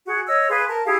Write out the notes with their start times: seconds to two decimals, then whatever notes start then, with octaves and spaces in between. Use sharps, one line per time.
0.06 F#4 G#4
0.27 C#5 D#5 E6
0.50 G#4 B4 F5 C6
0.67 A#4 A5
0.85 E4 G4 G#4 F5